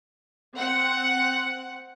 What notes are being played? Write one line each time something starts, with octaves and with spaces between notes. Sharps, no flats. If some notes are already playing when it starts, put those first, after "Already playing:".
C4 F#5